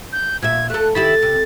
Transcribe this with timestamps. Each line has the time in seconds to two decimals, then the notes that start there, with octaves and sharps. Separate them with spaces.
0.13 G6
0.42 A#2 E5 G#6
0.70 A3 A4 F#6
0.95 D#3 E4 G4 A4 A6
1.22 C3